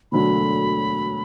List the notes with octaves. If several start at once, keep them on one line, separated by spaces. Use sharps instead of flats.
E1 D2 D3 F#3 A3 B5